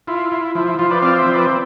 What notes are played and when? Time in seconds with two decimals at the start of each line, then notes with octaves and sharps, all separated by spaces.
0.07 E4 F4
0.32 E4
0.55 F3 E4
0.67 E4
0.79 F3 F4
0.91 B4 D5
1.02 C4 D5 F5
1.18 C5 E5
1.26 F3
1.34 B4 D5